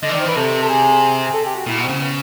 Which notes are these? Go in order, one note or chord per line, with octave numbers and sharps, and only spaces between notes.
D3 D#5
D#3 E3 D5
C5
E3 B4
C3 A4
A4
G#4
G#4
A4
G4
F#4
A#2 E4
B2
C4
C#3
B3